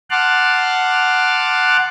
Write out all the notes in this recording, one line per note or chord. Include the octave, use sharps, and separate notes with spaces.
F#5 A5 C6 D6 F6 F#6